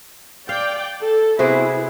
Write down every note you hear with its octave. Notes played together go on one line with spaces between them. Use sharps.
D5 F5 G5
A4
C3 B3 C4 E4 F#4 G#4